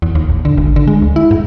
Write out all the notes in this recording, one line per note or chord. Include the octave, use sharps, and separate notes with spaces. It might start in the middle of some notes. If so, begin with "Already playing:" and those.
E2
D#2
A#1
D3
G#1
D3
G#3
D2
E4
G#2